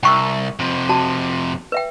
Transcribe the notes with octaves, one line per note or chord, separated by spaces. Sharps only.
C2 G5 C#6 E6
F2 C3
F#4 A5
B4 E5 G5